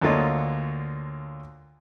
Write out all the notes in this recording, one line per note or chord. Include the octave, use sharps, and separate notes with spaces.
D2 D3 A#3 F4 C#5 D#5